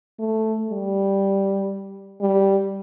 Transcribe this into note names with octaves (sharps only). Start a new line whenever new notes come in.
A3
G3
G3